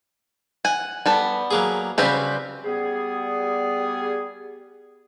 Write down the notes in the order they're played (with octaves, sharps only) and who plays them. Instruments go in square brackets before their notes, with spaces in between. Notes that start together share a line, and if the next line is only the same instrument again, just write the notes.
[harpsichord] F#5 [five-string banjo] G#5
[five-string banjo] G3 B3 A4
[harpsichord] F#3 A#3 G#4
[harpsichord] C#3 C4 F#4 [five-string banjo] G3 B4 C5
[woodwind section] G3 B3 G#4